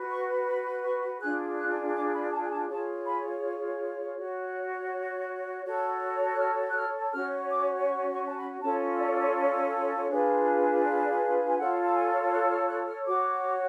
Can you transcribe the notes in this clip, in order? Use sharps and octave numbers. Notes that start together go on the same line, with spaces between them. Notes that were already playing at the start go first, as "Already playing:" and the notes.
Already playing: F#4 B4
C#6
B5
C#6
D4 F4 G#4 F#6
F#6
D6
B5
A5
G#5
A5
F4 G#4 C#5 A5
B5
F#4 C#5
F#4 A4 C#5
F#6
F6
F#6
F6
C#4 F#4 C#5 F6
D6
C#6
C#6
A5
B5
C#4 F4 A4 C#5 A5
D5
D4 F4 G#4 B4
D5
G#5
F4 A4 C#5 F#5
A5
G#5
F#6
F6
F#6
F6
F#4 C#5 D6